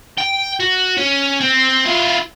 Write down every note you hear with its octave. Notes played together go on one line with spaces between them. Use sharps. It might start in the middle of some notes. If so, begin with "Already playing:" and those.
G5
F#4
C#4
C4
E4 F4